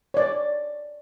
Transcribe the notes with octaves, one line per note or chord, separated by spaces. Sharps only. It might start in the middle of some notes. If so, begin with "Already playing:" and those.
C#5 D5